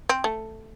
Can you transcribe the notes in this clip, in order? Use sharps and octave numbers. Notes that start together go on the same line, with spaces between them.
C4
A3